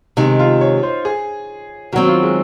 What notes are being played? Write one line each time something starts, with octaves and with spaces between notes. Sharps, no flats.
C3 D#3 G#3 D#4
F4
C#5
C5
G#4
D#3 F#3 C4 F#4
F4
G#3